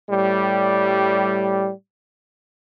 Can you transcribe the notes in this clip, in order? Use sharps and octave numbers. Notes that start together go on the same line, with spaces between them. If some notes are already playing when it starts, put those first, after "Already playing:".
A2 G3